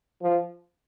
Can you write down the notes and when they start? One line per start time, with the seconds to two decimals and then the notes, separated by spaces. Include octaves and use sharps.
0.22 F3